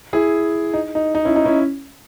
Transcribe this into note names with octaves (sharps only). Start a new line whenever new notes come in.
E4 G#4
D#4
D#4
D#4
C#4 E4
D#4
C#4 E4